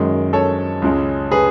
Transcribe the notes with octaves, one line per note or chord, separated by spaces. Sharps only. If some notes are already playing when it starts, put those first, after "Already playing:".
Already playing: F#2 D#3 G#3
A4 C#5
C#2 C#3 G#3
G#4 B4